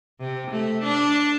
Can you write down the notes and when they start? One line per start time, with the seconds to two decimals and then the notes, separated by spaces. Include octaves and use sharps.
0.20 C3
0.51 A3
0.84 D4